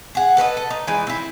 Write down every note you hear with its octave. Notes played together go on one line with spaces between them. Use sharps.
G#4 F#5
A4 B4 C#5 D#5
A4
D#4
E3 F3 G#3 D#4
C4 E4